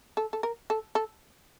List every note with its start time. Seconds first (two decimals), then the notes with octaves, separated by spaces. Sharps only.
0.17 A4
0.33 A4
0.43 A#4
0.70 A4
0.95 A4